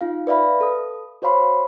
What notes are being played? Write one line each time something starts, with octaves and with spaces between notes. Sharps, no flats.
D#4 F4 F5
B4 D5 E5 F5 B5
A4 D#6
F#4 C5 C#5 F5 B5 C6